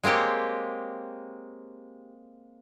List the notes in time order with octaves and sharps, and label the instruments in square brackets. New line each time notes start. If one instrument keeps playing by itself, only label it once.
[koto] G#3 A#3 C4 G4 C#5